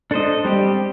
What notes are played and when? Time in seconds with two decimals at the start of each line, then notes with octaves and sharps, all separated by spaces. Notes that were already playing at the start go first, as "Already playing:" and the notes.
0.11 D4 A4 C5 D#5
0.45 G3 C4 G4